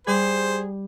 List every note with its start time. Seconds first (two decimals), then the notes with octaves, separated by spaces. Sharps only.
0.07 G3 G#4 C5